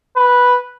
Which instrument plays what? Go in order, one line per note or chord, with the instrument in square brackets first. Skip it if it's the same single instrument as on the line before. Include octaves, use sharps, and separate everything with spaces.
[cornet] B4